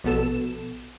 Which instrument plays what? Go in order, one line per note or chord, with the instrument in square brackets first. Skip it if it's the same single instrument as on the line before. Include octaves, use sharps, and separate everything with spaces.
[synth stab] A#1 B2 B3 A4 E7